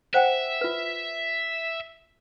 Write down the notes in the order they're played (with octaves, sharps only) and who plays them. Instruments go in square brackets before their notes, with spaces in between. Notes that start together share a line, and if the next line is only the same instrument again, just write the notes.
[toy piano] C5 F#5 G5 [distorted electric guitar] E5
[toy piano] F4 B4